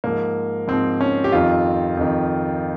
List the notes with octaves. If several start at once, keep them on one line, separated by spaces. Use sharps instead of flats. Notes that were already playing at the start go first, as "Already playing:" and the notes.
G#2 F3 A#3
G#2 F3 C4
C#4
G4
F2 D#3 F4
F2 D#3